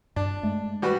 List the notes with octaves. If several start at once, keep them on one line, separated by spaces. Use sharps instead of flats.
G2 D4
G#3 A3
G3 F#4 B4